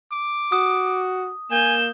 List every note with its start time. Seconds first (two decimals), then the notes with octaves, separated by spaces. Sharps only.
0.12 D6
0.52 F#4 D#6
1.51 A#3 G#5 G6 E7